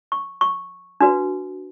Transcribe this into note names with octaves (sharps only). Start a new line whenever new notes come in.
C#6
C#6
D4 F#4 B4